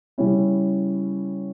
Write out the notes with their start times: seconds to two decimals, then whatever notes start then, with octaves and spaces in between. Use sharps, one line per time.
0.18 C#3 G3 C#4 E4